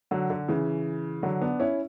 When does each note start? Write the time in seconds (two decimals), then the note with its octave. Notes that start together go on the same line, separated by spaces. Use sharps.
0.11 D3 F#3
0.30 D3
0.48 C#3 E3
1.23 D3 F#3
1.41 B3 D4
1.60 C#4 E4